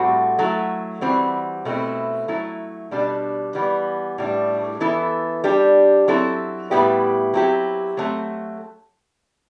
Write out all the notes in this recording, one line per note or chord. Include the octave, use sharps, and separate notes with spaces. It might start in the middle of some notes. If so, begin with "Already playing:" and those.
Already playing: A2 G3 C4 F#4 A4
F#3 A3 E4
E3 G3 C4 F#4
B2 A3 C4 E4
F#3 A3 E4
B2 G3 D4
E3 G3 B3
A2 G3 D4
E3 B3 E4 A4
G3 D4 G4
F#3 C4 E4 A4
A2 G3 B3 E4 G4
F#3 C4 E4 G4
F#3 A3 C4